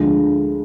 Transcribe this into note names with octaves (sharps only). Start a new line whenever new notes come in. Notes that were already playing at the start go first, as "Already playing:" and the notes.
Already playing: D2 D3 F3 G#3